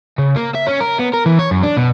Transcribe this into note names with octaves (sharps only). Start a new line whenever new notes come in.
C#3
A#3
E5
C#4
A#4
B3
A#4
E3
C#5
F#2
D4
B2